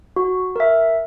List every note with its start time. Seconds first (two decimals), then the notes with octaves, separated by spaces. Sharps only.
0.16 F#4
0.56 A#4 E5